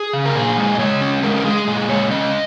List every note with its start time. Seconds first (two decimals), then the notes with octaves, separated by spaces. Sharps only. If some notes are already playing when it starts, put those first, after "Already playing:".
Already playing: G#4
0.13 C#3
0.26 A#4
0.35 A#2 G#4
0.58 G#3
0.75 D#5
0.79 G#3 C#5
1.01 C#4
1.23 G#3 A#4
1.36 A#4
1.45 G#3 G#4
1.67 A#2 G#4
1.89 G#3 C#5
2.11 C#4 D#5